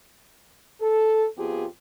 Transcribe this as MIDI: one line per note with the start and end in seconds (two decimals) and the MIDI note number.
0.81 1.26 69
1.38 1.66 41
1.38 1.66 59
1.38 1.66 65
1.38 1.66 67
1.38 1.66 68